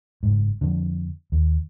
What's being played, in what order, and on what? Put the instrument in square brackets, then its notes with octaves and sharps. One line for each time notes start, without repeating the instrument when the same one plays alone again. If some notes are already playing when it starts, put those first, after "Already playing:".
[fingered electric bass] F#1 G#2
F2 D3
D#2